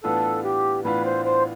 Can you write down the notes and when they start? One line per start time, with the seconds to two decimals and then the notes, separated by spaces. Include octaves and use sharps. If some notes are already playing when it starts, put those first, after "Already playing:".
0.04 A2 E3 B3 D4 F4 A4
0.44 G4
0.85 A2 E3 B3 D4 F4 B4
1.05 C5
1.25 C5